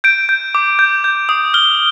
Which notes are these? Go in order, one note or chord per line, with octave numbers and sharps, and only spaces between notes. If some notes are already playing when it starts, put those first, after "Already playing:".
G6 D7
G6
D6
G6
G6
D#6
F6 G7